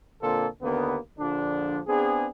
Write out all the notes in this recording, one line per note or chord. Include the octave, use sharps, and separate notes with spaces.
A#2 D3 A#3 C4 F4 A4
D#2 D3 A#3 B3
A#1 D3 F3 D4
B3 C4 D4 G#4